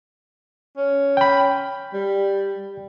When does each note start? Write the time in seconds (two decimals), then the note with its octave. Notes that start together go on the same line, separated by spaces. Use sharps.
0.77 C#4
1.17 G5 B5
1.93 G3